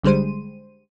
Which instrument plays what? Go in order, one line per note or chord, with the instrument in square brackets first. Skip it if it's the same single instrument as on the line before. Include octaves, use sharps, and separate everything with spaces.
[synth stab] A#1 D3 G3 G#3 C5 D#7